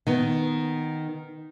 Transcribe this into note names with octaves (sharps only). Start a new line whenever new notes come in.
D#3 B3